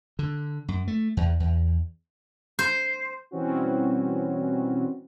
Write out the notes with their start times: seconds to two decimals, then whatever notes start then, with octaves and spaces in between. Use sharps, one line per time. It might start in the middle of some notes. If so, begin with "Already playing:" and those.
0.19 D3
0.68 F#2
0.88 A3
1.17 E2
1.40 E2
2.59 C5
3.31 B2 E3 G3 C4 C#4 F#4